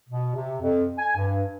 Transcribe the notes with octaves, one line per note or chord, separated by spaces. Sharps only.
B2
C3
F2
G#5
G2